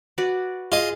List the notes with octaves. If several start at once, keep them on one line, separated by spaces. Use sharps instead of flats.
F#4 B4 D5
F4 G#4 D#5